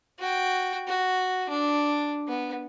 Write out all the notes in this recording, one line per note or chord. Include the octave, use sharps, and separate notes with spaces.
F#4 G5
F#4
D4
B3